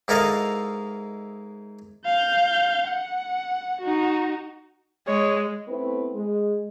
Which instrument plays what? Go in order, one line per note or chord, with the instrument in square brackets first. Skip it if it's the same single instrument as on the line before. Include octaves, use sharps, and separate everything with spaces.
[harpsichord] G#2 E4 A4 A#4 D#5 F5
[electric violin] F5 G6
F#5
D#4 F#4
[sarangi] G#3 [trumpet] C#5
[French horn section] A3 B3 C4 E4 B4
G#3